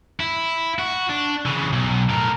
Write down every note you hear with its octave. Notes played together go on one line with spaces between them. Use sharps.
E4
F#4
D4
C#3 E3
B1
A2 A#4